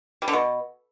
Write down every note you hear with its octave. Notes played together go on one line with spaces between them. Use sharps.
G3
D3
B2